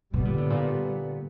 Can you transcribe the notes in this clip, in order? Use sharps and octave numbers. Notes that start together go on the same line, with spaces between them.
B2 D3 G3 B3
A#2
A2
A#2